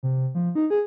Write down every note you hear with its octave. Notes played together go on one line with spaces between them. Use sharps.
C3
F3
D#4
G#4